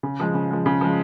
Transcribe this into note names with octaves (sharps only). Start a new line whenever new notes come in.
C#3
F3 G#3
C#3
F3 G#3
C#3
F3 G#3